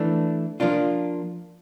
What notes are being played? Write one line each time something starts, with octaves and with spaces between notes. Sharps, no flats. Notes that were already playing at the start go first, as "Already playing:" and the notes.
Already playing: E3 A3 D4
F3 A#3 D4 F4